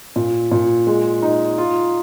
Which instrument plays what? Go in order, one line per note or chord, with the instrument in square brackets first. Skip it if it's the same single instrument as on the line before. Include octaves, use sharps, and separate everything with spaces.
[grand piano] A#2
A#2
G#3
D#4
F4